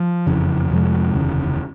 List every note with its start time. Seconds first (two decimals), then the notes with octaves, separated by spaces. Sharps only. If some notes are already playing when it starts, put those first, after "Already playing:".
Already playing: F3
0.27 F#1 F2 C#3 E3
0.70 F2 C3 F3 G#3
1.14 F1 D#2 C#3 E3